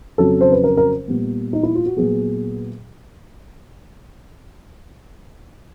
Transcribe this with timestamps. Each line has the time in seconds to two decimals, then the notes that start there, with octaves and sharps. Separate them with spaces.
0.18 F2 C#3 F#3 A4
0.41 C5
0.52 B4
0.64 A#4
0.77 A#4
1.08 A#2 G3 B3
1.53 D#4
1.63 E4
1.75 F4
1.86 F#4
1.97 A#2 F#3 B3 G#4